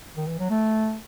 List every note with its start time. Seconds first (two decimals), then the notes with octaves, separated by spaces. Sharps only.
0.17 D#3
0.27 E3
0.39 F#3
0.50 A3